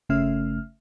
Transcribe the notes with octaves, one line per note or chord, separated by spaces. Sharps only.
G1 C#3 A3 C#4 E5 F6